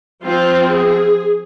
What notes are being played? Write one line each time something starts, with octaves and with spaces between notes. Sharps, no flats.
F3 C4 F4
G#4